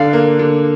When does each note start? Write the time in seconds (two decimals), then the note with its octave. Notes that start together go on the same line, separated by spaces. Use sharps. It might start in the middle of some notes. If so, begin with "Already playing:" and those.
Already playing: D3 D5 F5
0.13 A#3
0.39 D3